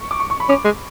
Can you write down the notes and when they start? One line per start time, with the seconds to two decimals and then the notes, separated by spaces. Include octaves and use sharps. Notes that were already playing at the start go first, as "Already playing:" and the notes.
Already playing: C#6
0.11 D6
0.20 C#6
0.30 C#6
0.40 B5
0.49 C#4 D6
0.64 G#3